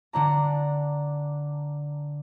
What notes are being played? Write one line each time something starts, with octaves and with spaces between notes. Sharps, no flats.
D3 D4 A#5